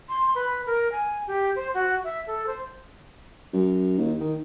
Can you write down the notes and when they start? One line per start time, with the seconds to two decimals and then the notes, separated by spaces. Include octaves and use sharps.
0.09 C6
0.35 B4
0.66 A#4
0.92 G#5
1.27 G4
1.56 C5
1.74 F#4
2.04 E5
2.27 A4
2.47 C5
3.53 F#2
3.98 D#2
4.20 D#3